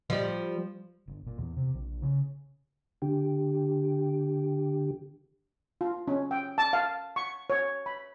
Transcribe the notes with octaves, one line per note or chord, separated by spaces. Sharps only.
F3 G3
G1
A#2
E2
C3
A#1
C#3
D3 G4
F4
C#4
G5
A5
F5
C#6
C#5
B5